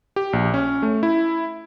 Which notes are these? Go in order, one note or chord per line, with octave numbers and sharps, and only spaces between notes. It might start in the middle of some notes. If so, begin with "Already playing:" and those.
G4
A#1
C#4
A3
E4